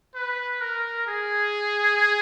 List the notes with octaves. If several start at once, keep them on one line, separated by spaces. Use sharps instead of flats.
B4
A#4
G#4